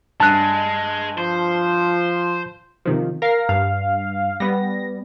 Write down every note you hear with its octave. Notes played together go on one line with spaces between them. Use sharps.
G2 G#3 A5 F#6
F3 C5
C3 D#3 F3
A#4 F5 A#6 C7
G2 F5
G3 B3 A#6